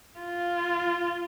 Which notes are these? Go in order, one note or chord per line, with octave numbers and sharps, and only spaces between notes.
F4